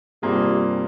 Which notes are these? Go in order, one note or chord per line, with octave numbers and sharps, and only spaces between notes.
G2 C3 G3 A#3 F4 G#4
C3